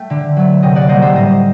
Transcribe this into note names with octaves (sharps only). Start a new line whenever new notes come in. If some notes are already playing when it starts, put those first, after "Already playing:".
Already playing: A3 G5
D3
F#3 A3
C3 D#5 G5
D5 F#5
G3 A#3 C5 D#5
A4 C5
A2 C5 D#5